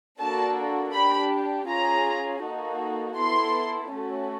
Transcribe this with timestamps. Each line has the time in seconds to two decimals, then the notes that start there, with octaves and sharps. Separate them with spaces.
0.19 A#3 D4 F#4 A4 A5
0.93 D4 G4 B5
1.68 C#4 F4 G#4 A#5
2.43 A#3 D#4 F#4 A4
3.17 B3 E4 A4 C6
3.92 A3 C#4 F#4 A4